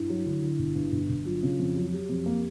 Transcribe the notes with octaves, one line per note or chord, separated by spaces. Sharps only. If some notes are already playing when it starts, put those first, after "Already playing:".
Already playing: G2 E4
F#3
D3
D3
G1
G2
G1
G1
F#3 F4
C#3
F2
F#3
F#3 G4
F2
A#3